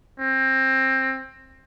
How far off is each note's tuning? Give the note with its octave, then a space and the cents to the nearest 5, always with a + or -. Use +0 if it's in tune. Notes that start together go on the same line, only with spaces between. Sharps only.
C4 +20